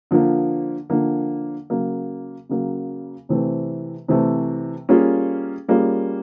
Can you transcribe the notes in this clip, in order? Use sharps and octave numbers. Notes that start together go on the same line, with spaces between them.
D3 F3 A#3
D3 F3 A#3
C#3 F#3 A#3
C#3 F#3 A#3
C3 E3 A3 C4
C3 E3 A3 C4
G3 A#3 C#4 F4 G#4
G3 A#3 C#4 F4 G#4